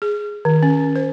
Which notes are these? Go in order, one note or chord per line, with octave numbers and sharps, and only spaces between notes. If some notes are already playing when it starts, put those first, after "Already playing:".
G#4
D#3
C#4
C5